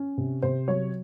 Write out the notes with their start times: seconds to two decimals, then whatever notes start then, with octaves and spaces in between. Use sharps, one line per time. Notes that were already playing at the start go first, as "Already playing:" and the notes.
Already playing: C#4
0.18 C3
0.42 C3 C5
0.68 F#3 C#5